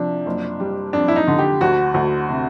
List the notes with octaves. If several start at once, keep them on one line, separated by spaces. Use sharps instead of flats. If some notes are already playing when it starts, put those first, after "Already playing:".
Already playing: C3 F3 D4
F#1
G3
F2 D4
E4
D#4
D3
G4
D2 F#4
D2
C3